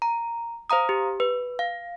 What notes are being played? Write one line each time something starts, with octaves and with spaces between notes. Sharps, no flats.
A#5
C5 F5 A#5 D#6
G4
B4
F5